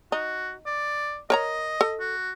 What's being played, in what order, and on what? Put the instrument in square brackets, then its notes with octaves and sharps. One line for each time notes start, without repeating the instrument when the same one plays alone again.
[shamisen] D#4 [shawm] F#4
[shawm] D5
[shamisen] A#4 C#5 A#5 [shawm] D#5
[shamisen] A4
[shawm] F#4